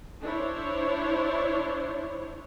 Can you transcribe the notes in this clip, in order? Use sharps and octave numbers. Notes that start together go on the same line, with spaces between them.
D4 E4 C5 C#5